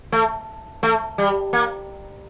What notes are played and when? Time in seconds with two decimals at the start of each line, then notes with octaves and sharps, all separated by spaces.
0.12 A3
0.83 A3
1.18 G3
1.53 A#3